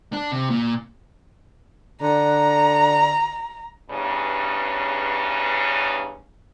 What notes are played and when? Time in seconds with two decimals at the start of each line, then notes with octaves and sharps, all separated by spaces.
0.13 D4
0.32 C3
0.50 A#2
2.02 D3 A#5
3.90 E2 G2 C#3